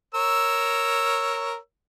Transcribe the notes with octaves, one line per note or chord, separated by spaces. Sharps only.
A#4 C#5 E6